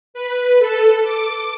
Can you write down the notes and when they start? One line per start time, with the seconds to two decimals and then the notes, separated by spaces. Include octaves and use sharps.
0.14 B4
0.59 A4
1.03 D6